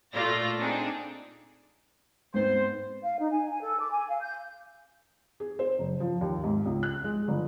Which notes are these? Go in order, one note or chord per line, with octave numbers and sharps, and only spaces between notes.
A#2 A3 F4 D5 A#6
C4 D4 D#4 G#4
G#2 B3 C4 C5
F5
D#4
G#5
G#5
A4
D6
G#5
F5
G6
G#4
C5
F#1
F3
D#2
G#2
C#2
F#6
G#3
G1